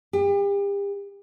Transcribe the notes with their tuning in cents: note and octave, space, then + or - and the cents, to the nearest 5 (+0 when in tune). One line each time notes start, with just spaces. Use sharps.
G4 +35